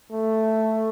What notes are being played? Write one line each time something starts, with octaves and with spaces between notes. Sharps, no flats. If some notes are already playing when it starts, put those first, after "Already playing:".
A3